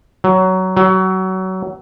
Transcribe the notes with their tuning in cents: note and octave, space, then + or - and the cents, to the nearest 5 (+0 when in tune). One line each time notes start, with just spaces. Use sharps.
F#3 +15
F#3 +25